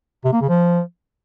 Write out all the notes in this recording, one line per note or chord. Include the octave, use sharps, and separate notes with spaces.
C3
A#3
C#3
F3